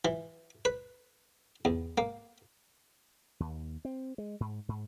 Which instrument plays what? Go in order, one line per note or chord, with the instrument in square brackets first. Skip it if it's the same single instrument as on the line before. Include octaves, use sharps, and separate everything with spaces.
[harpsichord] E3
B4
E2
A#3
[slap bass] D#2
C4
G#3
G#2
G#2